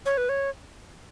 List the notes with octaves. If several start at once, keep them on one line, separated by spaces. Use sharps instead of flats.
C#5
B4
C#5